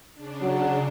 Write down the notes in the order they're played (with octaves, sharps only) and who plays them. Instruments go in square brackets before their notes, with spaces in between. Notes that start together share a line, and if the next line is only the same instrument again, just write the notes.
[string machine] C#3 D4
[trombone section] F#3